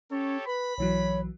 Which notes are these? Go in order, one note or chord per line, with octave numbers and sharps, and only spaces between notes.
C#4 G4 A4 C#5
B4 B5
B1 E3 F#3 C#5